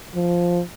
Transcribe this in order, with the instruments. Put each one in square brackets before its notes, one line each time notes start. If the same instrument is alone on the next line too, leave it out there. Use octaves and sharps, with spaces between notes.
[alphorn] F3